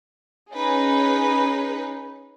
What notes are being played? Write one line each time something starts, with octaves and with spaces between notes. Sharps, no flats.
C#4 D#4 G#4 B4